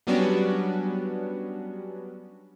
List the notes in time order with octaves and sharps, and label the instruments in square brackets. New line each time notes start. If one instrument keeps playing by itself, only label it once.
[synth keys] F#3 G3 B3 C#4 D4 F#4